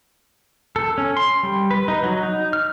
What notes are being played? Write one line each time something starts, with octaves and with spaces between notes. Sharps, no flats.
A4
C#4
C6
G3
B4
D#4
F#3
D#4
F6